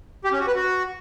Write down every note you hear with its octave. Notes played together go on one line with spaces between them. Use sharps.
G4
C#4
F#4
B4
F#4